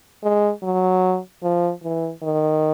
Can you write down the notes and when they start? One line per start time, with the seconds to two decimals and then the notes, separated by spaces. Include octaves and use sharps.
0.23 G#3
0.63 F#3
1.43 F3
1.83 E3
2.23 D#3